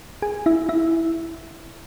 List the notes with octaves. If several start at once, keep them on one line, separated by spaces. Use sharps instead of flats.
G#4 G#5
E4 E5
E4 E5